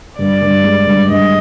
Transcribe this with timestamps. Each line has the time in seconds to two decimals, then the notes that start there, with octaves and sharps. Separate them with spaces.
0.19 G2 D5
0.41 G2
0.64 G#3
0.87 G2
1.09 G2 D#5